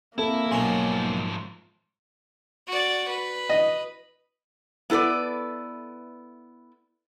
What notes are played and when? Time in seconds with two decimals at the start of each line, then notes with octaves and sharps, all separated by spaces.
0.18 A#3 C4 E4 A4
0.52 B1 G#2 F3 C#4 G#5
2.67 F#4 D5
3.08 B4
3.49 D#5
4.90 B3 E4 A4 B4 D5